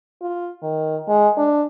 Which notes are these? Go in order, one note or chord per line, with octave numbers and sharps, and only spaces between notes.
F4
D#3
G#3
D4